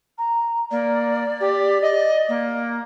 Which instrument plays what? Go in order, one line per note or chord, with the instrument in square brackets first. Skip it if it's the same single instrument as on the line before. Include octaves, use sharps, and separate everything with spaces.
[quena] A#5
[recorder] A#3 [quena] D5
[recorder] G4
D#5
A#3